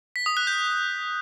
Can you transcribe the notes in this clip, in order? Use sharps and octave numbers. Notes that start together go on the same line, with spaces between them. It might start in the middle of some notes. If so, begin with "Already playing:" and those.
B6
D#6
F#6
G6